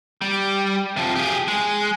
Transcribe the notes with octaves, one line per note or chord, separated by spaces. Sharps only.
G3
C3 F3
G4 G#4
G#3